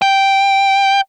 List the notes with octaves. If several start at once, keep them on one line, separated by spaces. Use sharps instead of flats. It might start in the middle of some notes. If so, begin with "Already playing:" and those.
G5